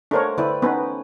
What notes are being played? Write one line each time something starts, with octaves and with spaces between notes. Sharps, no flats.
A3 D4 A#4 C5 C#5 F#5
D3 E4 B4 D5 G5
B3 C#4 D#4 B4